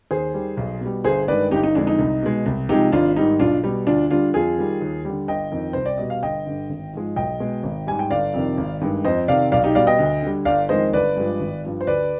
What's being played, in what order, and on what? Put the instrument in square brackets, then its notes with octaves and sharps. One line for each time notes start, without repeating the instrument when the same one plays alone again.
[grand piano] D#2 G#4 C5
D#3 G3
B1
B2 G3
G1 G#4 C5
G2 D#3 G#3 B4 D5
G1 D#4 G4
D#4
F2 D3 G#3 D4
D#4
C2
B2 G#3
C2
C3 F3 G#3 D#4 G4
G#1 D4 F4
G#2 D#3 G3 D#4
B1 D4 F4
B2 G3
D2 D4 F4
D3 G3 D4 F4
F2 F4 G#4
D#3 G3
D#2
D3 G3
G1 D#5 G5
F2 D#3
C2 C5
D5
B2 G3 D#5
F5
G1 D#5 G5
G2 D3
G#1
G#2 F3 G#3
B1 D#5 G5
B2 G#3
G#1
G#2 G3 G#5
G5
G1 D5 F5
F2 C3 D#3
G#1
G2 D#3 G#3
F2 C5 D#5
C3 D#3 D5 F5
B1 D5 F5
D#4 G4
B2 G3 D5 F5
D#5 G5
D2
D3 G3
G1 D5 F5
F2 D#3 G#3 C5 D#5
G1 B4 D5
G2 F3 G#3
G#1
G2 F3
C5
D2 B4 D5